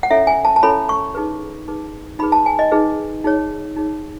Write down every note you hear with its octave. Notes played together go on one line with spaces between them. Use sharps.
F#5
C#4 E4 A4 C#5 E5
G#5
A5
A5
C#4 E4 A4 C#5 B5
C#6
D#4 G#4 B4
D#4 G#4 B4
D#4 G#4 B4 B5
A5
G#5
D#5
D#4 G#4 B4
D#4 G#4 C#5
D#4 G#4 C#5